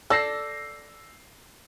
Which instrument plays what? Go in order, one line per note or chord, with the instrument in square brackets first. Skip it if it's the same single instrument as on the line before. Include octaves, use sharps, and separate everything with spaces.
[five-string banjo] A4 D5 [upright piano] E6 A#6 C7